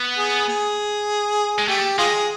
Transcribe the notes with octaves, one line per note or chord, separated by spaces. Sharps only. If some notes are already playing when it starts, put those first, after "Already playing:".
Already playing: B3
G#4
G#4
G#3
A3 G4
G#3 F4 G#4